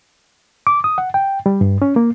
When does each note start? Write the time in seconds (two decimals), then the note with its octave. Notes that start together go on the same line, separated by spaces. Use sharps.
0.67 D6
0.84 D#6
0.98 F#5
1.14 G5
1.46 G3
1.61 G2
1.82 C#4
1.96 A#3